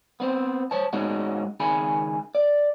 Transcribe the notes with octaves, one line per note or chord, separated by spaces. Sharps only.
B3 C4 C5
C5 C#5 A5
G#2 G#3 C#4 D#4 F#4
C#2 D#3 G#4 G#5 B5
D5